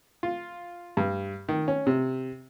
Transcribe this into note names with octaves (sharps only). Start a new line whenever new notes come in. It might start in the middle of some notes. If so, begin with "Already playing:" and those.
F4
G2
D#3
C#4
C3